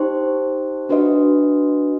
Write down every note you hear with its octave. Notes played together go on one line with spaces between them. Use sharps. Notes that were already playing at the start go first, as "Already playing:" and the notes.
Already playing: D#4 G4 C5 D#5
D4 F#4 B4 D#5